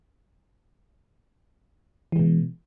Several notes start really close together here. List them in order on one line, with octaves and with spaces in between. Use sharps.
E3 G#3 B2